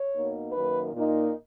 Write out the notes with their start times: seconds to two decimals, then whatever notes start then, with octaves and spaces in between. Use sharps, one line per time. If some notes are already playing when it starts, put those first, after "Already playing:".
Already playing: C#5
0.14 B2 A#3 D#4
0.52 F#2 D#3 A#3 B4
0.91 A#2 A#3 D#4